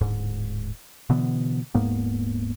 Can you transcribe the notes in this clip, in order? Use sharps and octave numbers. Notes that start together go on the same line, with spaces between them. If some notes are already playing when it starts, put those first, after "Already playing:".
D1 G#2
B2 D3 E3 B3
D#1 G#2 A#3 B3